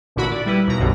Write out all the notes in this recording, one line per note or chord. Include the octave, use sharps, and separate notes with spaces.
A1 A#2 D3 E4 F#4 B5
D5
G3 E4 B4
D#2 B2 A#5
B1 F#2 B2 D3 G3